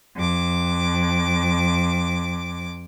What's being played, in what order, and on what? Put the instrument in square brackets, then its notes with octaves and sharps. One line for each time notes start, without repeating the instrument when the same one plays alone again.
[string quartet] F2 D6